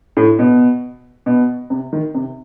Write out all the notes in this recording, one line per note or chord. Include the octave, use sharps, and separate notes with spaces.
A2
B2
B2
C3
D#3
C3